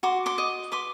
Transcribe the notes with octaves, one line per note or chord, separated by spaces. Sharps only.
F#4 C6 D6
C6 D6
D#5
B4 C6 D6